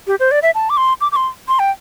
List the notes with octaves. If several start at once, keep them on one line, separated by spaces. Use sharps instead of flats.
G4
C5
D5
E5
A5
D6
C6
D6
D6
C6
C6
G5